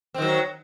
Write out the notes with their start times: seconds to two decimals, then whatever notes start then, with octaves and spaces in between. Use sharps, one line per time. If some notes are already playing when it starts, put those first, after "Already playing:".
0.14 C4
0.18 D#3
0.22 F#3